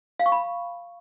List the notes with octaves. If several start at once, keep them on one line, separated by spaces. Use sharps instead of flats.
F5
C#6
B5